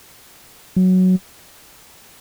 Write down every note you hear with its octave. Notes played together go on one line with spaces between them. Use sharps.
F#3